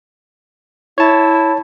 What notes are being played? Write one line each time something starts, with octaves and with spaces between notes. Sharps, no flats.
E4 C#5 A5